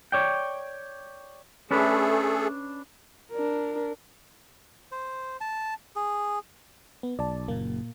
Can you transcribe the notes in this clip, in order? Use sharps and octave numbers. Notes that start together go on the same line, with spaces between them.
C#5 D5 G5
A3 C#4 D4 G#4 A4 B4
D4 A#4
C5
A5
G#4
B3
B1 D5 A5
F#1 A#2 A#3